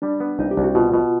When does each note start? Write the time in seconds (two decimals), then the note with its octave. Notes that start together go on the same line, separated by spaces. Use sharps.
0.02 G3 D4
0.20 B3
0.39 C2 D#4
0.51 G4
0.57 C2
0.64 F#4
0.75 B2 F4
0.94 B2